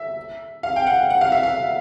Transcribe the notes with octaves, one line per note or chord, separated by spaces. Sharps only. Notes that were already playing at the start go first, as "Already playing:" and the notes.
Already playing: E5
F5
G5
F#5
F#5
F5
E5
F5